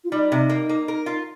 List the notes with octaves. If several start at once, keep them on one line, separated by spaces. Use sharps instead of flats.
F4
G3 D#4
C3
A#3
A#3
A#4
F4